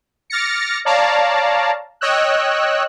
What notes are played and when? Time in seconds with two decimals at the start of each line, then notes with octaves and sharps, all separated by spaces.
0.30 D6 F6 A6 A#6 C#7
0.85 C#5 D5 F5 A5 A#5
2.01 C#5 D#5 G5 E6 F#6